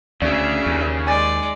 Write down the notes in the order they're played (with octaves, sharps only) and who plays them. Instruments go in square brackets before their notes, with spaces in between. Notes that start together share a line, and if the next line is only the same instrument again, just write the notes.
[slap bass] D2 [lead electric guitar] C#3 [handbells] D5 [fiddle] E5
[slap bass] D#2
[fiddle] G#3 D5 [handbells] G#5 A6